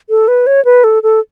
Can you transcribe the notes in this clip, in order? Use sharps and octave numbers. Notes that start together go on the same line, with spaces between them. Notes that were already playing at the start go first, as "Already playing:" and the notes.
A4
B4
C#5
B4
A4
A4